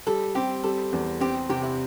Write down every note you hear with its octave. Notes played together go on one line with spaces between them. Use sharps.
G3 A4
C4 G4
G3 A4
E2
C4 G4
C3 G4
E4